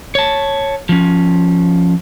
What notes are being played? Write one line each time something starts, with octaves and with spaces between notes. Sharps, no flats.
C#5 A5
F3 C#4